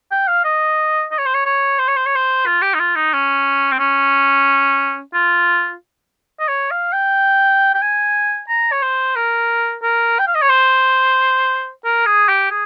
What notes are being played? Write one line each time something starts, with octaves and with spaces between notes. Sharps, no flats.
G5
F5
D#5
D#5
C#5
C5
C#5
C#5
C5
C#5
C5
C#5
C5
F4
G4
D#4
F4
D#4
C#4
C4
C#4
F4
D#5
C#5
F5
G5
G5
G#5
A#5
C#5
C5
A#4
A#4
G5
F5
D#5
C#5
C5
A#4
G#4
G4
G#4